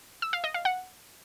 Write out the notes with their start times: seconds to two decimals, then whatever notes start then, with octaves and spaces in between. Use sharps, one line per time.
0.22 E6
0.33 F5
0.44 D#5
0.54 F5
0.65 F#5